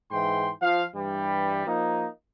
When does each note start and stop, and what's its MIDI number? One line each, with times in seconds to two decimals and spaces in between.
0.11 0.50 44
0.11 0.50 52
0.11 0.50 79
0.11 0.50 84
0.62 0.84 53
0.62 0.84 77
0.95 1.64 43
0.95 1.64 52
0.95 1.64 55
1.67 2.07 53
1.67 2.07 58
1.67 2.07 63